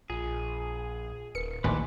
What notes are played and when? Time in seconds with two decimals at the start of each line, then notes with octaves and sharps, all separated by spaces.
0.10 A#1 F4 G#4
1.35 D#1 A#4 B4 C#7
1.64 A#1 D#2 A2 E3 B4 G#5 C6 D6